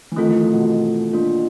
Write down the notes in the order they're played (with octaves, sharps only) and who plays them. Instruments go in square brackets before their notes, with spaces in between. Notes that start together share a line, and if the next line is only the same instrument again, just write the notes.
[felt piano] E3
[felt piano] D#3 [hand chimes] A3 C4 F4 A4
[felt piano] E3
F3
B2
B2
[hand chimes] A#3 D4 F4